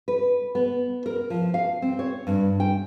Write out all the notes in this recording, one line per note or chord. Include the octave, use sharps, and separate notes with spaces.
B4
B3
A#4
F3
F5
C4
C#5
G2
G5